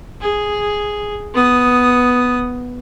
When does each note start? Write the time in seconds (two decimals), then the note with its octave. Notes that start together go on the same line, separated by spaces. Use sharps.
0.21 G#4
1.34 B3 D#6